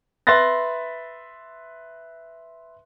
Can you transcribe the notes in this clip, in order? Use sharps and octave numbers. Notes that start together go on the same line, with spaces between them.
B4 E5 C6 F#6 A6 A#6